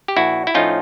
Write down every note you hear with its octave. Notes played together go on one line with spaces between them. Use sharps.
G4
A#1 E4 F#4
E4
A2 F3 A3 C#4 D#4 F4